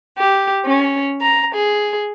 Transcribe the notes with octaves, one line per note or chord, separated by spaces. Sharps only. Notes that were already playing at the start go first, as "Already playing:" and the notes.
G4
C#4
A#5
G#4